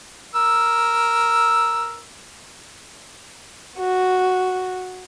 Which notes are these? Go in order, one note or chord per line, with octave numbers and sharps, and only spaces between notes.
A#4 E6
F#4